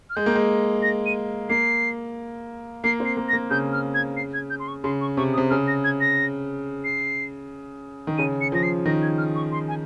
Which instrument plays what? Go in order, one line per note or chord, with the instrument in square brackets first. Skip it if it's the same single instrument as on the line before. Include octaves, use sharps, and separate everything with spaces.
[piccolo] F6
[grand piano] G#3 [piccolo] G6
[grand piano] A#3
G#3
[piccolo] A#6
D#7
[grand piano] A#3 [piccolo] C7
[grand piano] A#3 [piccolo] C7
[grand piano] C4
[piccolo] C7
[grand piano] A#3
[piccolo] A#6
[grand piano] A#3
[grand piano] C#3 [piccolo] G6
[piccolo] F6
G#6
C7
G#6
G6
C6
C#6
[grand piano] C#3 [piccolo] C6
[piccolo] C#6
[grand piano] C3 [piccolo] C#6
[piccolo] D#6
[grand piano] C3
[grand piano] C#3 [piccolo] F6
[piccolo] A#6
G#6
A#6
C7
[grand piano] D#3
[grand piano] C#3 [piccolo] D#7
[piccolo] C#7
[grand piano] F3 [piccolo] A#6
[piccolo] C7
[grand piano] D#3 [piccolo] A#6
[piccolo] G#6
F6
C#6
C6
G#5